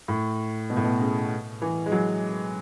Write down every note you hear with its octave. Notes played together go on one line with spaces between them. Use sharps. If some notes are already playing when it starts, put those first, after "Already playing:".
A2
B2
A2
B2
C#3
E3
G#3
F#3